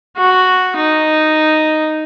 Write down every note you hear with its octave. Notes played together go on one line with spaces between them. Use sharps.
F#4
D#4